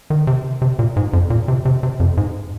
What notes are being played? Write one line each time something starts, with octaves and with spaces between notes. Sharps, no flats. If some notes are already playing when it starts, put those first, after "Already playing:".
D#3
C3
C3
A#2
G#2
F2
A#2
C3
C3
C3
F2
G#2